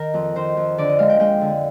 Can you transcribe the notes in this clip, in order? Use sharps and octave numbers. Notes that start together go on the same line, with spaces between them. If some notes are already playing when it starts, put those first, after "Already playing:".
Already playing: D#3 A#4
F2
D#3 C5
F2
D3 D5
D#5
G#3 F5
G5
G#3 G5
D3